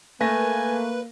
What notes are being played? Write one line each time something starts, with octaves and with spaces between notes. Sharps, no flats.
A3 A#3 B4 G#5 A#6